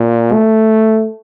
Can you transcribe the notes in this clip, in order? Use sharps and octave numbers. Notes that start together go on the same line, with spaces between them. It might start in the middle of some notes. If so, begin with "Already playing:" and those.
Already playing: A#2
A3